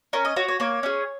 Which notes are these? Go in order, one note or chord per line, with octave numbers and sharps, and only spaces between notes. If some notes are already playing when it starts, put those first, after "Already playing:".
C#4 A#4
D#5
F#4 C#5
C#5
A#3 C#5
C#4 G#4